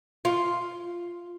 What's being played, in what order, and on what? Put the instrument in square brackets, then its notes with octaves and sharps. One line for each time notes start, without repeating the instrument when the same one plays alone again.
[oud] F4